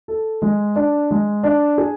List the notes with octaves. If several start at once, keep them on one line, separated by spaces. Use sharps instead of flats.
A4
G#3
D4
G#3
D4
G#4